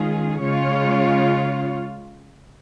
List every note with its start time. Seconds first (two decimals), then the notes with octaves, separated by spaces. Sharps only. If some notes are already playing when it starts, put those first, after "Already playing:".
Already playing: D#3 G#3 C#4 F4 G#4
0.41 C#3 G#3 F4 C#5